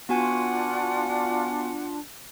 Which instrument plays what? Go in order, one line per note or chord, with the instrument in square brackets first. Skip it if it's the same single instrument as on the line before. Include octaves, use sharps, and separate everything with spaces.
[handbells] B3 F#4 G#5 [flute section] D4 F4 [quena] F#5